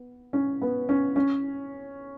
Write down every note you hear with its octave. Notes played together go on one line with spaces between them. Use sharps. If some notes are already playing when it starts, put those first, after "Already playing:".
Already playing: B3
C#4
B3
C#4
C#4